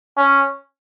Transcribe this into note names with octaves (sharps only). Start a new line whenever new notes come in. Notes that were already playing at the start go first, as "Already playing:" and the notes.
C#4